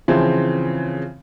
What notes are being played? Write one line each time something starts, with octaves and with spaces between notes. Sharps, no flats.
C#3 E3 F3 C4